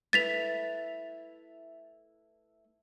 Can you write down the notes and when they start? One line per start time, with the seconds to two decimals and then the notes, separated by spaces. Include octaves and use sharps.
0.13 A3 E4 B4 A6 B6 F7